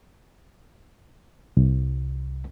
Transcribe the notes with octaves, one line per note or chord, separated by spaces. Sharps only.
C2